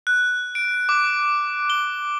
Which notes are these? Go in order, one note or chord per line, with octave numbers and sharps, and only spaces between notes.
F#6
D7
D6
G7